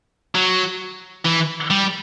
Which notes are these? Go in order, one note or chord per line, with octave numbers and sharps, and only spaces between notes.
F#3
E3
G3